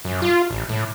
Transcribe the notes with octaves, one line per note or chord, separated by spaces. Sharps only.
F#2
F4
A1
A2